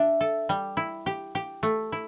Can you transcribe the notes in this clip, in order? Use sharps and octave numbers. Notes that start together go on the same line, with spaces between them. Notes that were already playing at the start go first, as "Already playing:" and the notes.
Already playing: D4 E5
A4
G3
E4
G4
G4
A3
E4